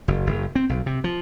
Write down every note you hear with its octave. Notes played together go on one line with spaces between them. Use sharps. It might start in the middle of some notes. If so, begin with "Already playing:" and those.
F#1
F#1
C4
B1
C3
F3